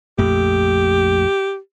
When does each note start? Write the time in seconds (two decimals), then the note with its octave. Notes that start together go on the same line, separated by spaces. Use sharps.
0.19 A#1 F2 A3 G4